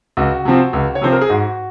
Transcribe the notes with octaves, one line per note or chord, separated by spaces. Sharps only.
C#2 F#4
C3 F3 C4
C#2
C#5
C3 F3 C4 C5
A#4
G#4
G#2 F#4